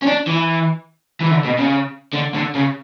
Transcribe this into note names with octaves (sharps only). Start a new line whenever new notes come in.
C#4
D4
E3
E3
D3
B2
C#3
D3
D3
C#3